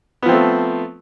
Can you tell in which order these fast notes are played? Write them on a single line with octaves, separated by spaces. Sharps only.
B3 F3 C4 A3